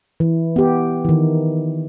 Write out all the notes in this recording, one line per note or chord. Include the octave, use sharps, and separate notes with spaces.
E3
B3 G4
D#3 E3